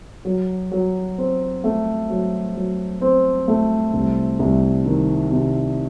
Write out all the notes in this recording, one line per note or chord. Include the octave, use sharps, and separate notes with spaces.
F#3
F#3
C4
A3
F#3
F#3
C4
A3
C2
C2
D#3
C3